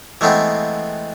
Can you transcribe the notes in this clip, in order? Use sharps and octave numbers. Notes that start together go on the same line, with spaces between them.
E3 G#3 A3 B3 C4